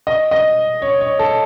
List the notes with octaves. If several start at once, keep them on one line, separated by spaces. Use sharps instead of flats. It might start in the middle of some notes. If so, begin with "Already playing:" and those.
D#5
D#5
C#5
C#5
A4